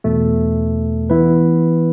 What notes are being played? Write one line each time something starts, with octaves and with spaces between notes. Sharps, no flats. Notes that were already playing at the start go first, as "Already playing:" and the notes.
E2 B2 A3
E3 B3 E4 B4